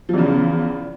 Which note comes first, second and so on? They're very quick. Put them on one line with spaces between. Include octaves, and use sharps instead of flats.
F3 E2 C#3